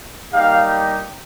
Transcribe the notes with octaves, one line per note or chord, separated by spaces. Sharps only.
G3 A#3 D#4 G4 F5